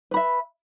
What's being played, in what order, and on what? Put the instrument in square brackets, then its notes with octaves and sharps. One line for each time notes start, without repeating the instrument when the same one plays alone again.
[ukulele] B4
B5
E5